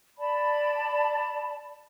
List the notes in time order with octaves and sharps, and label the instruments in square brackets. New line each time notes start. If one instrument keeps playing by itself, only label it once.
[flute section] D5 A5 B5